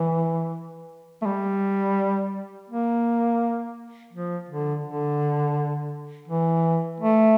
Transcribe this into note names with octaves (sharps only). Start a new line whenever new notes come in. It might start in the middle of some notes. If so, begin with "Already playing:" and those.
Already playing: E3
A3
G3
A#3
F3
D3
D3
E3
A3